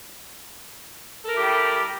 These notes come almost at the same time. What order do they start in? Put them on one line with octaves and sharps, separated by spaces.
A4 A#4 E4 G4 G3